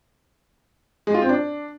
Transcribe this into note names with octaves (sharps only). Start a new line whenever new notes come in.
G#3
F4
C4
D4